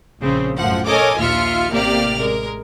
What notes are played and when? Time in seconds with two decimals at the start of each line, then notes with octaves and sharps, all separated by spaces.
0.20 A#1 C#3 C4
0.57 F#2 A2 F3 F#5
0.85 A4 A#4 C#5 D#5 G#5 D6
1.17 A#1 D#2 F4 E5 F6 C#7
1.71 A1 C3 A#3 G4 D5 F6
2.18 G#3 A#4